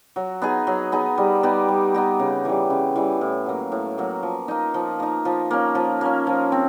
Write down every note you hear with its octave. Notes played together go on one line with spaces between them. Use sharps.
F#3
B3 D#4 G#4
F#3
B3 D#4 G#4
G3
B3 D#4 G4
G3
B3 D#4 G4
C#3
E3 G3
C#3
E3 G3
A2
F#3 A#3
A2
F#3 A#3
F3
A#3 D#4
F3
A#3 D#4
F3
A#3 C#4
F3
A#3 C#4
F3
C4